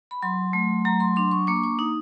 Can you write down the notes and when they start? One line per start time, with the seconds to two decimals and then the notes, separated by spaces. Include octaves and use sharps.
0.11 B5
0.22 F#3 C6
0.53 A3
0.85 F#3 A#5
1.00 C6
1.16 D4 C6
1.31 C#6
1.47 A#3 D6
1.56 C#6
1.64 D6
1.79 D#4 D#6